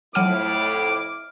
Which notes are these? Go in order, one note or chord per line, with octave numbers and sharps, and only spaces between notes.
F2 A2 F#3 E4 F#5 D6 F6 D#7